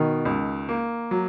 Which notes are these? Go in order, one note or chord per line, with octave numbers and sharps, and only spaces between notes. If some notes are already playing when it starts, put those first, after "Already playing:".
Already playing: B2 D#3
C#2
A#3
F#3